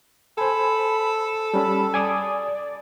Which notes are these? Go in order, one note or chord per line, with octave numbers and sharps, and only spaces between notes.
A4 C5 G#5 B5
G3 C#4 B5
D5 G#5 D6 D#6